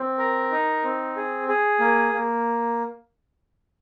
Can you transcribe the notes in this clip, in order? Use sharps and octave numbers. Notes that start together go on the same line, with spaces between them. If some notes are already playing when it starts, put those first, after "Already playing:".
Already playing: C4
A#4
D#4
C4
G#4
G#4
A#3
A#3